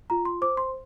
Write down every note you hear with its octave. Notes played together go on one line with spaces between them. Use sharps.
F4 A#5
C6
C5 D6
C6